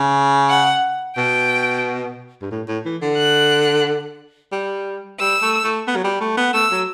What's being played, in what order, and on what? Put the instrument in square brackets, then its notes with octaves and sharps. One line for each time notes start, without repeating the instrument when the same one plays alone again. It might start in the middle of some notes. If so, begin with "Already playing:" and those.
Already playing: [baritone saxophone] C#3
[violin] F#5
[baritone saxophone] B2 [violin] G5
[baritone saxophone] G2
A2
A2
E3
D3
[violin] F#6
[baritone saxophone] G3
[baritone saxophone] G3 [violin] E6
[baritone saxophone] A3
A3
B3
F#3
G3
A3
B3
[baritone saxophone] A3 [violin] E6
[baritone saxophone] F#3